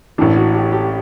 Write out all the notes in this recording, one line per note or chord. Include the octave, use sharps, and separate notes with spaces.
A1 A2 E3 D4
F#4
G4
G4